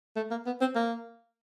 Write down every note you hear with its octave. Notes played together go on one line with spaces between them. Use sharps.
A3
A#3
B3
C4
A#3